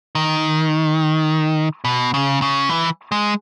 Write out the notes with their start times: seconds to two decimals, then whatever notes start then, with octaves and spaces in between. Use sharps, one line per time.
0.15 D#3
1.85 B2
2.14 C#3
2.42 C#3
2.69 E3
3.12 G#3